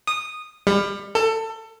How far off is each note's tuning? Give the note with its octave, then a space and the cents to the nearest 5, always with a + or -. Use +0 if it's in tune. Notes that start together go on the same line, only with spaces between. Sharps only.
D#6 -10
G3 +30
A4 +25